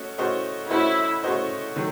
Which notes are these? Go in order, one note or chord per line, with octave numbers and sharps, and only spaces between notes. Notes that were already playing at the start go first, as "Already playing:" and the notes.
Already playing: A3 C#4 F#4 D#5
A3 C#4 F#4 C5 D#5
A3 C#4 E4 F#4 C5 D#5
A3 C#4 F#4 C5 D#5
D#3 F#3 A3